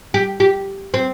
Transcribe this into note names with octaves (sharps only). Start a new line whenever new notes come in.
G4
G4
C4